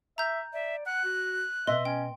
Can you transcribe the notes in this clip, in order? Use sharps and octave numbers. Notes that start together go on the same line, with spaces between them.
E5 A#5 G6
D5 E5
F#5 F#6
F#4
B2 D#5 E5 C6
C#4 G5